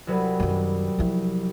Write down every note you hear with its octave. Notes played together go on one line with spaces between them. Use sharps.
C2 F#3 B4
F#2 D#3
F3 E4